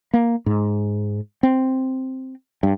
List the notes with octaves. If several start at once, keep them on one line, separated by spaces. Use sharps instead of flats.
A#3
G#2
C4
G2